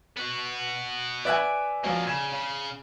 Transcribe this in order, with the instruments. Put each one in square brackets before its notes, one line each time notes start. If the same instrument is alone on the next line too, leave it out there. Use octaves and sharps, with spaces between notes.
[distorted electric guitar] B3 F#4
[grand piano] B4 E5 F#6 [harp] D5 G#5
[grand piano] F3 F#3 C#4 [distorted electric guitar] A#3 A4
[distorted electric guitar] C#3 [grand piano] G#6 E7
[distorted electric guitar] C#3